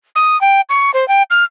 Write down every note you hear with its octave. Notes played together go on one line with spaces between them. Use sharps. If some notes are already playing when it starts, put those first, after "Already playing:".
D#6
G5
C#6
C5
G5
F6